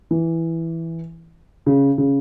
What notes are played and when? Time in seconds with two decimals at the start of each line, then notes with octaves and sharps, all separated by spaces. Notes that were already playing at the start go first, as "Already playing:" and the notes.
0.11 E3
1.66 C#3
1.98 C#3